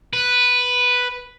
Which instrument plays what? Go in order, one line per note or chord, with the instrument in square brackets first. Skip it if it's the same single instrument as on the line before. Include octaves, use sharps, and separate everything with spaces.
[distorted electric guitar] B4